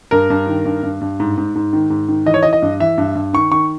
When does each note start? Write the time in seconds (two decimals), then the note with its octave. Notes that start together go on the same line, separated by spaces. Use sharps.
0.11 G2 A#4
0.30 G2
0.47 D#3
0.65 G2
0.83 G2
1.01 G2
1.20 G#2
1.38 G#2
1.55 G#2
1.73 D#3
1.90 G#2
2.08 D#3
2.26 E3 D#5
2.34 C#5
2.43 E3 D#5
2.53 D#5
2.62 G2
2.80 E3 E5
2.98 G2
3.15 G2
3.33 D#3 C#6
3.51 D#3 C#6